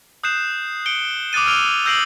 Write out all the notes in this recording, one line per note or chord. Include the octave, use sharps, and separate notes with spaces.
D#6 F#6 G6 C7 E7
C#7 D7 G7
D6 D#6 F#6 A6 D#7
E6 F6 G#6 D7 F7 G7
E6 G6 A#6 C7 D7 F#7